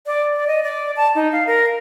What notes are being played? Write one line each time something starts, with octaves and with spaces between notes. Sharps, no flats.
D5
D5
D#5
D5
A5
D#4
F5
A#4